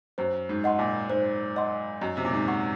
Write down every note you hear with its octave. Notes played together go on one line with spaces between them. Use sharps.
F#2 C5
G#2
D#5 F#5 C6
A#2
G#2 C5
D#5 F#5 C6
F#2 D#5
C3
A#2
G#2
F#5 C#6